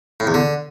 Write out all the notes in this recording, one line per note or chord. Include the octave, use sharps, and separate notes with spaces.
A2
E2
D3